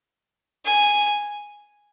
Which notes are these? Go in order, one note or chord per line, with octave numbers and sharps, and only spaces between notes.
G#5